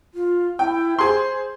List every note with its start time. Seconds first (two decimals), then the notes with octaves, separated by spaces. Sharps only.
0.14 F4
0.59 E4 G5
0.99 G#4 C5 C6